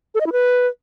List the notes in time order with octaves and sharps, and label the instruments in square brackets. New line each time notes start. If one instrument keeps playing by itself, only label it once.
[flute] A4
D#5
E4
B4